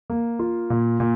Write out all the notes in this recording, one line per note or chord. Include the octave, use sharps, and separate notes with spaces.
A#3
F4
A#2
A#2